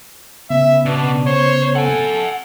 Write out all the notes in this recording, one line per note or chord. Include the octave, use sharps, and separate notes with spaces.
C#3 B3 E5
B2 D4
C5 C#5
A4 F#5 G#5